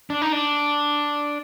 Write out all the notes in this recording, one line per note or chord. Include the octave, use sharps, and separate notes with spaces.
D4
D#4
D4